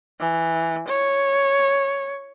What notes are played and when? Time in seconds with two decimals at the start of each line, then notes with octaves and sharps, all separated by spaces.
0.20 E3
0.88 C#5